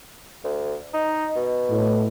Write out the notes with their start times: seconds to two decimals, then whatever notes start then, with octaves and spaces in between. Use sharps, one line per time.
0.44 D2
0.94 D#4
1.36 B2
1.70 A2